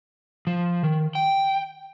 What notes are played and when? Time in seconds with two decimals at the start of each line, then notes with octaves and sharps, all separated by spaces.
0.47 F3
0.83 D#3
1.15 G5